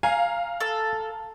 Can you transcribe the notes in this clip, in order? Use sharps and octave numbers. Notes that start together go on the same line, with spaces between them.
F5 G#5 A#5
A4